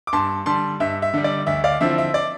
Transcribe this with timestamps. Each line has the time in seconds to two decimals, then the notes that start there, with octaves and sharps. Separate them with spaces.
0.07 D6
0.13 G2 A5 C6
0.46 D3 G3 A5 C6
0.80 G2 E5
1.02 E5
1.14 D3 G3
1.24 D5
1.47 D2 E5
1.64 D5 F5
1.81 D3 F3 C4 E4 E5
1.98 E5
2.14 D5